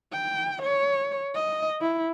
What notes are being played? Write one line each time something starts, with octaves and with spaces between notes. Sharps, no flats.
G5
C#5
D#5
E4